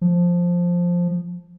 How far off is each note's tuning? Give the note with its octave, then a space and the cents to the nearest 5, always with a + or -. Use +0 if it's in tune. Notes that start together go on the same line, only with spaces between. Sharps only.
F3 +5